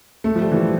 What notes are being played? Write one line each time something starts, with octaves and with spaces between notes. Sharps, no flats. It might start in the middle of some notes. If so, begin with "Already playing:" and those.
A3
F3
G3
E3
F3